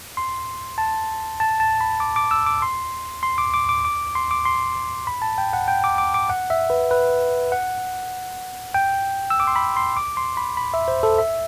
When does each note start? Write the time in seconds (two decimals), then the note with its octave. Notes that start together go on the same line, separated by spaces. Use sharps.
0.17 C6
0.78 A5
1.40 A5
1.60 A5
1.81 B5
2.00 D6
2.16 D6
2.31 E6
2.46 D6
2.62 C6
3.23 C6
3.38 D6
3.54 D6
3.69 D6
3.85 D6
4.15 C6
4.31 D6
4.45 C6
5.07 B5
5.22 A5
5.38 G5
5.53 F#5
5.68 G5
5.84 D6
5.98 D6
6.14 D6
6.29 F#5
6.50 E5
6.70 B4
6.91 B4
7.52 F#5
8.74 G5
9.30 E6
9.40 D6
9.47 C6
9.56 B5
9.77 C6
9.97 D6
10.17 C6
10.37 B5
10.57 B5
10.74 E5
10.88 C5
11.03 A4
11.18 E5